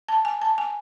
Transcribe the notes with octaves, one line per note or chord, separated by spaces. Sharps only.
A5
G#5
A5
G#5